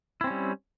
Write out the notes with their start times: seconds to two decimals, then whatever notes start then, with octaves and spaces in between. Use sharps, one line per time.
0.21 E4
0.24 C4
0.27 C#4
0.30 G3